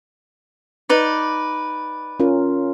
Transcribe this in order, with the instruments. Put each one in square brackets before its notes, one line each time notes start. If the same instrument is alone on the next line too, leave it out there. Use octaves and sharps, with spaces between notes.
[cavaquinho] D#4 B4 D5
[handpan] C#4 F4 A#4